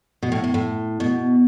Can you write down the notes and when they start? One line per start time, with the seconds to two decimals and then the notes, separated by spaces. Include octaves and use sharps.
0.23 B2
0.32 A2
0.44 A2
0.54 A2
1.00 B2